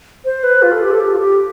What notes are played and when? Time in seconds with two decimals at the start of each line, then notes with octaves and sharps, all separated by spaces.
0.25 C5
0.43 B4
0.62 F4
0.72 A4
0.82 G4
0.91 A4
1.00 G4
1.13 F4
1.19 G4